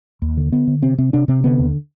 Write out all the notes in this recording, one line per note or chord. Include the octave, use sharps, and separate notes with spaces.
D#2
D3
D3 B3
D3
C3 C4
C3 C4
C3 D4
C3 C4
D3 B3
D#2